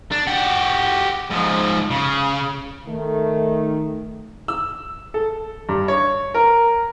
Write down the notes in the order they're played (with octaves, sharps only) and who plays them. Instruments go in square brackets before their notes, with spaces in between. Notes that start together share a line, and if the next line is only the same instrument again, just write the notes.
[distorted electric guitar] D4
F#4 G4
G#2 F3
C#3
[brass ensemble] D#3 A3
[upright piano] E6
A4
G2
C#5
A#4